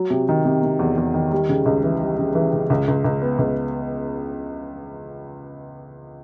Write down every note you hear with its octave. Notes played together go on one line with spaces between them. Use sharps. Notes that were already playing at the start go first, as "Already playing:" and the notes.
Already playing: F#3
C3
D#3
C3
C3
E2
E2
D#3
G3
C#3
C#2
E3
G3
C#3
E3
C#3
C#2
C#2
C#2
B3
C#2